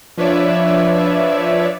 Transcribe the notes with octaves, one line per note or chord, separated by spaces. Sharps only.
F3 D4 B4 C#5 D5 E5